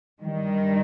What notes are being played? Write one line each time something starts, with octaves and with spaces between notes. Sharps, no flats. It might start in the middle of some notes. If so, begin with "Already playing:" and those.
G2 D#3 G3